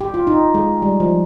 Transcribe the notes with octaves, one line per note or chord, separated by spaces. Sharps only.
G4
F4
D#4
G#3
G3
F3